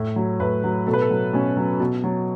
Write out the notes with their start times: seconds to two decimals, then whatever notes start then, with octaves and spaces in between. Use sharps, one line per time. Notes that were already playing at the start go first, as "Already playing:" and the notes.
Already playing: A2
0.16 F#3
0.40 A2 B4
0.64 F#3
0.87 B2 A4
0.93 B4
1.01 A4
1.10 F#3
1.33 B2 C#4
1.57 F#3
1.80 B2
2.04 F#3